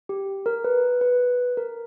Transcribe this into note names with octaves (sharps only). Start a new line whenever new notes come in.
G4
A#4
B4
B4
A#4